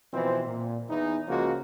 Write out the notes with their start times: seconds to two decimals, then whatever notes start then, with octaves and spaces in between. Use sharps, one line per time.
0.13 B2 E3 F3 C4
0.47 A#2
0.89 E2 E3 D#4
1.28 C#2 C#3 F3 G#3 A#3 F#4